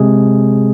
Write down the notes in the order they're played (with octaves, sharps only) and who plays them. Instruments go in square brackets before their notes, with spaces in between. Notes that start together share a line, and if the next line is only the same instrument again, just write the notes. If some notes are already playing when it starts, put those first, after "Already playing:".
Already playing: [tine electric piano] C3 G#3 G#4